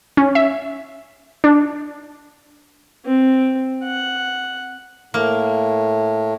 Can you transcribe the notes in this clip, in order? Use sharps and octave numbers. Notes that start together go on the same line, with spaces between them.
C#4
E5
D4
C4
F#5
A2 A#3